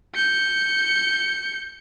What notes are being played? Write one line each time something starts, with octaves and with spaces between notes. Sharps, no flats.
G6 C#7